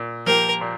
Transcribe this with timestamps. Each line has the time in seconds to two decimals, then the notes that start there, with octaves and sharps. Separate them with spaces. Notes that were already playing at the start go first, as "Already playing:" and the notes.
Already playing: A#2
0.26 F3 A#3 G4 A#4
0.61 A#2